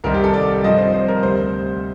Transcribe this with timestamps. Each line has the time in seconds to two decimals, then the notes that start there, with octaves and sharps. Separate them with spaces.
0.04 C2 C3 D#3 G3 C4 A#4
0.14 G4
0.24 A4
0.34 D5
0.64 G2 F3 C4 D#5
0.78 C5
0.94 C5
1.08 A#4
1.23 D2 C3 G3 C5